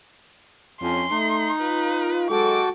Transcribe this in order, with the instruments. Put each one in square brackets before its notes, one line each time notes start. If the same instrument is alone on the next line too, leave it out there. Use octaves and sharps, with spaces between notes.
[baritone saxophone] F2 [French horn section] C#4 [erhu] C6
[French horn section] A3 [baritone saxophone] D#4
[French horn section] F4 [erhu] B4
[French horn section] B2 F#3 G#3 [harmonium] F#4 A4 G5 [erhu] D6